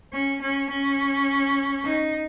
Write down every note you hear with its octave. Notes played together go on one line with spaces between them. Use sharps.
C#4
C#4
C#4
D#4